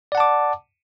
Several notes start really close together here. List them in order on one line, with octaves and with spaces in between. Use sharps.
D5 F#5 A5 D6